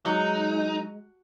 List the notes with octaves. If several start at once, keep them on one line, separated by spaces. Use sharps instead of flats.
F#3 G#3 D#4